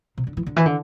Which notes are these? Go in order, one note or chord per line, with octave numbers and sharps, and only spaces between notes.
C3
D3
E3
D3
E3
D3